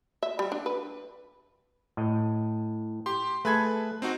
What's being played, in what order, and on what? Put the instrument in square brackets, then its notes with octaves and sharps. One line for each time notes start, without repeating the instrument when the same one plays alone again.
[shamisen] E5
G3
D4
B4
[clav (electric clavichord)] A2 D#5
[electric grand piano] G4 C6
[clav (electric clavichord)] A3 G#4 A4 [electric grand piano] B4 B5 G#6
[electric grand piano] C4 D#4 F#4